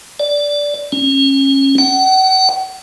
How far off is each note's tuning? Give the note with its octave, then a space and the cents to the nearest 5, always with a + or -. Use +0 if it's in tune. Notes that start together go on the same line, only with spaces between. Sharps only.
D5 -10
C#4 -30
F#5 +40